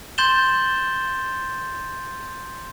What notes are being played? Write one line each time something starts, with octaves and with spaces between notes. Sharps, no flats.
C6 G6 A6 E7 G7